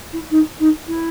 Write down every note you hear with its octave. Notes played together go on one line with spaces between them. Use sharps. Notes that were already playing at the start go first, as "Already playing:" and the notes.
E4
D#4
D#4
E4